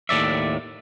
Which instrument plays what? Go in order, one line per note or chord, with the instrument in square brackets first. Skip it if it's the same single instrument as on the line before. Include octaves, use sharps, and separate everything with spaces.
[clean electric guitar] D#2 A2 D5 E5